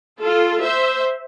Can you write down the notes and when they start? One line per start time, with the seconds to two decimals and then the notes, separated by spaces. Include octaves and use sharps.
0.22 F4 A4
0.63 C5 E5